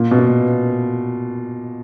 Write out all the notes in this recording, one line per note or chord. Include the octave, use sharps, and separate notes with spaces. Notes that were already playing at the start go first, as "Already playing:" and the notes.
Already playing: A#2
B2
A#2